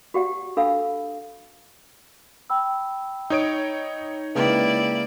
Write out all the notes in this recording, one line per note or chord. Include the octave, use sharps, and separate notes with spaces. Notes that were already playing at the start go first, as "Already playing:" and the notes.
F#4 G4 D5 F#5
D4 A4 F5 F#5 B5 E6
G5 B5 E6
D#4 C#5 D#6 C#7 D7
C#3 G#3 A#3 E4 B4 D5 G5